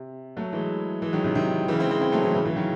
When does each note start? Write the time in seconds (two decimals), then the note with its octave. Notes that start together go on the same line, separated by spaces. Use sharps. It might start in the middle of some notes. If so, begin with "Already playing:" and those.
Already playing: C3
0.37 F#3 A3
0.52 E3 G#3
1.02 E3 G#3
1.13 D#3 F#3
1.24 C3 D#3
1.35 C3 D#3
1.68 C#3 E3
1.80 G#3 C4
1.90 G#3 C4
2.01 G#3 C4
2.12 F#3 A3
2.23 C#3 E3
2.34 C#3 E3
2.45 C#3 E3
2.56 D#3 F#3